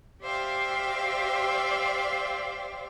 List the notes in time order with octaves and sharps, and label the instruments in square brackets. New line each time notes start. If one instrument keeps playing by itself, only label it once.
[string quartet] G4 C5 D5 E5 F5 G5